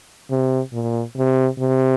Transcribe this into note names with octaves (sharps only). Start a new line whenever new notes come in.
C3
A#2
C3
C3